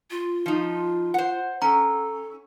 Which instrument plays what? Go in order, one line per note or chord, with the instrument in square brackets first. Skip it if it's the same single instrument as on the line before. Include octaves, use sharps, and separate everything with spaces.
[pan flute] F4
[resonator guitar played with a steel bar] F3 D#4
C5 F#5
[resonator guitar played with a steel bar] C#4 [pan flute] A4 [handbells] A#5